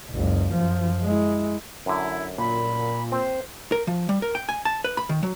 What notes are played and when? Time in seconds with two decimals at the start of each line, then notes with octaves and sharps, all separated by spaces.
0.11 F#1 C#2
0.53 F#2 F3
1.03 G#3 E4
1.86 F#2 D3 E4
2.38 A#2 B5
3.12 C4 C5
3.72 A#4
3.87 F3
4.09 G3
4.22 A#4
4.35 G5
4.49 G#5
4.65 A5
4.84 B4
4.97 B5
5.09 D#3
5.23 F#3